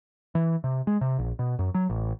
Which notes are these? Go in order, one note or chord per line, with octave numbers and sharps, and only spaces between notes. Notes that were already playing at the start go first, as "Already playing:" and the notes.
E3
C3
G#3
C3
A#1
B2
F#2
F#3
A1